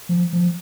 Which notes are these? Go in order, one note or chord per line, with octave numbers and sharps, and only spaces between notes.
F3
F3